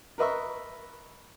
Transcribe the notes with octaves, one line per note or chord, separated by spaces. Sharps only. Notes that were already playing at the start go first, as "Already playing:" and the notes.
A#4 B4 D#5 E5 C#6